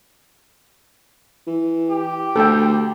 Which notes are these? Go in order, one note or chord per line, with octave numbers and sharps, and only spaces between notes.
E3
G4
D2 A4 G5